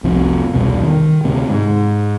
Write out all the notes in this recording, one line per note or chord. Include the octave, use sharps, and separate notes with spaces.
F1 C2 C3 F3
E1 C2 B2
D#3
D2 C3
G#2